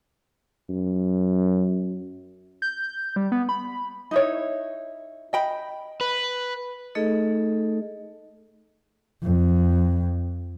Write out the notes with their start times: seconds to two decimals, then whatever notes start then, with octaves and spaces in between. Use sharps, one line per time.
0.69 F#2
2.62 G6
3.16 G3
3.32 B3
3.49 B5
4.11 D#4 E4 C#5
5.33 D#5 G5 B5
6.01 B4
6.95 A3 D#4 G#4 A4 D#5
9.23 F2